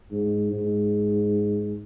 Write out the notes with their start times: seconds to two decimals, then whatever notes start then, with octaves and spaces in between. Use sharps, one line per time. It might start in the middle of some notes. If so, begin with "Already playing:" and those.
0.12 G#2
0.53 G#2